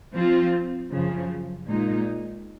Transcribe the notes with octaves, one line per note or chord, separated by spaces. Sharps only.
F3 C4 F4
F#2 C#3 F3
A#2 G#3 D#4